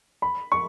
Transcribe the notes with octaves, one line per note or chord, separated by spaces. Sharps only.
B5
C#6